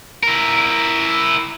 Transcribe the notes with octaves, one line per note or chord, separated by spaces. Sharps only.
E4 A#4